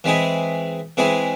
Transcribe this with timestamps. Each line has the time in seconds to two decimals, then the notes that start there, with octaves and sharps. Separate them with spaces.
0.04 E3 G#3 C4 E4 G#4
0.97 E3 G#3 C4 E4 G#4